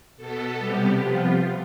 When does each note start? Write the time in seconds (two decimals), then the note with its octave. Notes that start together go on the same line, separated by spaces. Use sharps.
0.17 B2 B3 A4
0.57 C3 G3 B3 G4
0.97 C3 F3 B3 F4